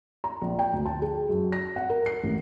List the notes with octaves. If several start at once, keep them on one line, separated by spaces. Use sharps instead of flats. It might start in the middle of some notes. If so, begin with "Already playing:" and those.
A#5
A#1
G5
D2
A5
G#4
F#2
A#6
F#5
A#4
C7
A1